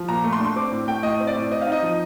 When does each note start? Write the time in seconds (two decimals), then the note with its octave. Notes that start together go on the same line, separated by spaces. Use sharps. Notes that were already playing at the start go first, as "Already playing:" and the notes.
Already playing: F3
0.08 A#2 A#5
0.24 A3
0.33 C6
0.39 D4
0.44 C6
0.56 C4 D6
0.71 A2
0.88 A3 G5
1.03 A2 D#5
1.20 C4
1.27 D5
1.35 A2
1.51 C4 D#5
1.61 F5
1.67 D#4 D#5
1.82 F3